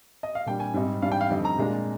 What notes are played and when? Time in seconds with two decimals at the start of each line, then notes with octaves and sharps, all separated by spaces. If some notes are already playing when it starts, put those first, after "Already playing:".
0.23 D#5
0.35 F5
0.46 A#2 G3 D4 G5
0.60 G#5
0.74 G#2 G3 C4 D#4
1.02 G#2 G3 D4 F5
1.12 G5
1.21 F5
1.30 F2 D3 G3 C4 D#4
1.45 A#5
1.58 A#2 G#3 D4